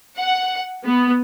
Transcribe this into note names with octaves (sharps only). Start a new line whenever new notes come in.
F#5
B3